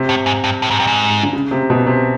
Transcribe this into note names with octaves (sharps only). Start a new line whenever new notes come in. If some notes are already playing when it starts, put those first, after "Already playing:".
Already playing: C3
A2
G#2
G2
A2
G#2
G2
G#2
D3
C#3
C3
B2
C3